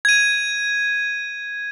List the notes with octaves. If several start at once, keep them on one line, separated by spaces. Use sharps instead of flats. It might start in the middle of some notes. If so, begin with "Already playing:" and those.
G#6 D#7